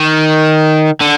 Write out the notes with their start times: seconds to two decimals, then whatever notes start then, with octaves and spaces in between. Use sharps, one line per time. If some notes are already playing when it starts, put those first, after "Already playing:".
Already playing: D#3
1.01 D3